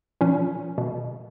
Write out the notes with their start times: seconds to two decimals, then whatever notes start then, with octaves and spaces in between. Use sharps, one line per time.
0.21 A#2 F3 C#4
0.78 B2